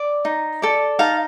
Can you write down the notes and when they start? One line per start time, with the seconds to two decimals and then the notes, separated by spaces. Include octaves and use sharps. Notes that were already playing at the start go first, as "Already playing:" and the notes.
Already playing: D5
0.25 D#4
0.62 A4 D5
0.99 D#4 F5 A5